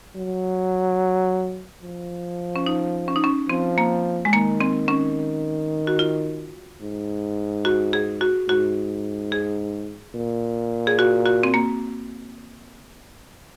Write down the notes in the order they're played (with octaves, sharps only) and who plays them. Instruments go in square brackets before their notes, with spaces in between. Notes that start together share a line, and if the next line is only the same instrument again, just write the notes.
[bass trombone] F#3
F3
[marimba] C#4
D#4
C#4
D#4
C#4
[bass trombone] F3 [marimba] C4
[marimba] A#3
G#3
[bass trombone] D#3 [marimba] A#3
[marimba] C4
C#4
F#4
F4
[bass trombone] G#2
[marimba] F#4
G#4
F#4
[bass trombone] G#2 [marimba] F#4
[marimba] G#4
[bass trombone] A#2
[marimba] G#4
F#4
F#4
C4
A#3